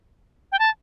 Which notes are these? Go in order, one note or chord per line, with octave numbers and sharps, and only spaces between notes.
G5
A5